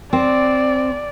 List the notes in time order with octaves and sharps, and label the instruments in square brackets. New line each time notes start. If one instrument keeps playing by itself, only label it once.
[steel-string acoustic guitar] C4 [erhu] D5